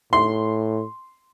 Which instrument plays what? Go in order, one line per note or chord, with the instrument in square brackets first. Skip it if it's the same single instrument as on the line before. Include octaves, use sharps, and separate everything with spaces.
[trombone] A2 [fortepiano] C6